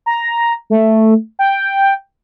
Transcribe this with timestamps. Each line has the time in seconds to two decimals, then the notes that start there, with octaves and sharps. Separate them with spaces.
0.06 A#5
0.70 A3
1.39 G5